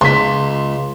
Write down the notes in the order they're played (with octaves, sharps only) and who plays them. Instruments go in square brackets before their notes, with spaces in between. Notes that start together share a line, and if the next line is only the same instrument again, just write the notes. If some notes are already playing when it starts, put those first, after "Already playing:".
[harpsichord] C#2 [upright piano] C6 B6